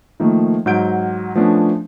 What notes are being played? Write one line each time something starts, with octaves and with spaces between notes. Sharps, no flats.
D#3 F3 A3 A#3
G#2 F#3 F#5 G6 D7
F3 A3 B3 C#4 D4